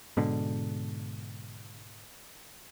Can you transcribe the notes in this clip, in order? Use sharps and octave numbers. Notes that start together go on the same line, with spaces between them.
G#2 B2 D3